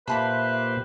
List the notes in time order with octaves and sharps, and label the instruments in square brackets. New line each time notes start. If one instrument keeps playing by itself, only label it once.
[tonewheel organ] A#2 G4 C5 [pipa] A#3 A5 B5 [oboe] B4 [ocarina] E5